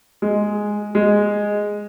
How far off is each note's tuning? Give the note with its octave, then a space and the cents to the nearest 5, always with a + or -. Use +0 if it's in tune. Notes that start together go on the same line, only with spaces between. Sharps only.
G#3 +0
G#3 -5